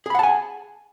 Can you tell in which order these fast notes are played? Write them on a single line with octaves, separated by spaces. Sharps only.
G#4 B5 F#5 A5 G#5